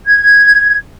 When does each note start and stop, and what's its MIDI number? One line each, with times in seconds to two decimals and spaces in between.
0.05 0.76 92